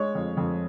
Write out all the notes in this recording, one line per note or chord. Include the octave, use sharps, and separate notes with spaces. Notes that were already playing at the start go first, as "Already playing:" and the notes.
Already playing: G#3 C#5
F2
F2